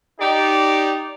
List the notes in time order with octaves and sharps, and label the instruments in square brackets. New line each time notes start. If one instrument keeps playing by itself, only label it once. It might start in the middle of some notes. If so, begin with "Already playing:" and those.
[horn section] D#4 G4 D5